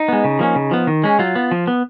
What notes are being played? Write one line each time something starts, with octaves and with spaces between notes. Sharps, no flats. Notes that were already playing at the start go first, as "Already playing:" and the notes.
Already playing: D#4
G#3 B3
C#3
F3 A#3 C#4
C#3
F3 B3
D#3
G#3 C#4
F#3 F4
B3
F3
B3